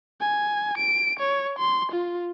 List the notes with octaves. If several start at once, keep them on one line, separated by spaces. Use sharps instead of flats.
G#5
D7
C#5
C6
F4